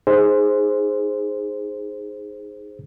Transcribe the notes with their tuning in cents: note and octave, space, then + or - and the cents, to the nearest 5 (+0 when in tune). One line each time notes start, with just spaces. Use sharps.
D#4 +0 G#4 +0 C5 +0